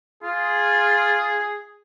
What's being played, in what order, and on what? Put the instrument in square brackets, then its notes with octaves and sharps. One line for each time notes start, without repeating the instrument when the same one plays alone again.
[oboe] F4 [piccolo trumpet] G#4